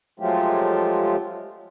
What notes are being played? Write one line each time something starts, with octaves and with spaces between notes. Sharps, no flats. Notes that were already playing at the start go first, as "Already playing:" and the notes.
F3 F#3 G#3 A3 F4 G4